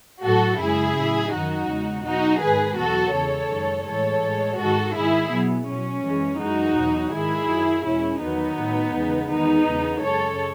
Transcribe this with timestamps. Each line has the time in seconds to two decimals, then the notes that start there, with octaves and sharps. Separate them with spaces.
0.23 A2 F#3 F#4 A4
0.59 F#2 C#3 G#3 E4 G#4
0.96 A2 F#3
1.33 F#2 D#3 F#3 D#4 F#4
1.69 E2 C#3 G#3
2.05 B2 F#3 D#4 F#4
2.42 G#2 D#3 G#3 G#4 B4
2.77 E2 B2 F#3 F#4 A4
3.14 E2 C#3 E3 G#3 A4 C#5
3.51 F#2 D#3 G#3
3.87 A2 E3 G#3 A4 C#5
4.24 A2 G#3
4.59 G#2 D#3 G#3 F#4 A4
4.95 G#2 D#3 G#3 E4 G#4
5.32 B2 F#3 B3
5.69 B2 F#3 C#4
6.04 F#2 E3 G#3
6.41 F#2 E3 G#3 D#4 F#4
6.77 E2 B2 F#3
7.13 G#2 D#3 G#3 E4 G#4
7.49 F#2 D#3 F#3
7.85 E2 B2 G#3 C#4 E4
8.22 E2 D#3 F#3 B3 D#4
8.59 A2 F#3
8.95 E2 C#3 G#3
9.31 E2 D#3 G#3 B3 D#4
9.68 E2 C#3 G#3
10.03 F#2 C#3 G#3 A4 C#5